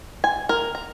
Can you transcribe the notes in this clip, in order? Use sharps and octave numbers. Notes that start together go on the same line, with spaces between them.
G#5
A#4
A#5